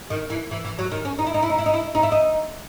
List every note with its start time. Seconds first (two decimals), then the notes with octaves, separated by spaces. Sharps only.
0.10 D#3
0.30 E3
0.51 E3
0.65 E3
0.79 F#3
0.92 D#3
1.05 C#4
1.19 D#4
1.27 E4
1.34 D#4
1.43 E4
1.50 D#4
1.58 E4
1.66 D#4
1.74 E4
1.95 D#4
2.03 E4
2.12 D#4